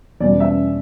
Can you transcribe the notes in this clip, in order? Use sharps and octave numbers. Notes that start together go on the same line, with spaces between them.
E2 B2 G3 D5
E5